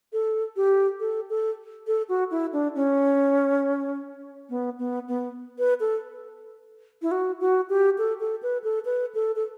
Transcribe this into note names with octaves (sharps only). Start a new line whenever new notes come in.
A4
G4
A4
A4
A4
F#4
E4
D4
C#4
B3
B3
B3
B4
A4
E4
F#4
F#4
G4
A4
A4
B4
A4
B4
A4
A4